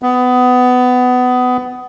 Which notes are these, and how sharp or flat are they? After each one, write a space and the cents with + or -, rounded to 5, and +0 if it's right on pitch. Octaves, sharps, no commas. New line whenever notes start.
B3 +20